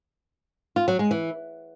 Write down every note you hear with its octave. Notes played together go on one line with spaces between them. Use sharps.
F4
F#3
G#3
E3